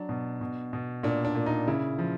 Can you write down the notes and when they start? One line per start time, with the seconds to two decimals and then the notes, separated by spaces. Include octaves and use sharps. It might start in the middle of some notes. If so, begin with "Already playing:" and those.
Already playing: F#3 D4
0.09 B2
0.41 B2
0.73 B2
1.03 A#2 D4
1.25 D4
1.35 A#2
1.46 D#4
1.68 C#3 E4
1.99 F3